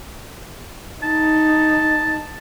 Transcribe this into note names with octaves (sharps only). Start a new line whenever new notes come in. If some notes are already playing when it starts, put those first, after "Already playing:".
D#4 A5